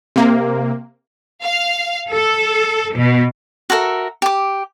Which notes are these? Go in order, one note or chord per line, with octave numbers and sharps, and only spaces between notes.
C3 A#3
F5
A4
B2
F#4 A4 A#4 E5
G4 D6